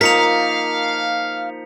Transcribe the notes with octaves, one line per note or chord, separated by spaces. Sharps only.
F3 A#3 D#4 A#4 F5 B6 C#7 F7